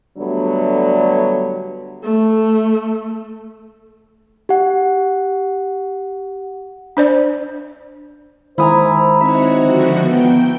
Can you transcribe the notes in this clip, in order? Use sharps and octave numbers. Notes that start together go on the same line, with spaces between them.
D3 F#3 G3 A3 B3 D4
A3
G4 F#5
D4 C5 D5
D#3 G#3 E4 C5 G#5 A#5 D#6
C4 D#4 F#4 C#5 E5
D3 F3 F#4
B3 G5